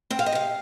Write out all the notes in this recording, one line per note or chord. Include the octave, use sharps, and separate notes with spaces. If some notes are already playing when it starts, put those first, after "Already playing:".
C4 G5
F5
D#5
C3 F5